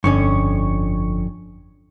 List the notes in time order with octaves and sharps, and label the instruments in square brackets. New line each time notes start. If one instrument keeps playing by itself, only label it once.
[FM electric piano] G1 C#6 [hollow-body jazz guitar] F2 D3 C#4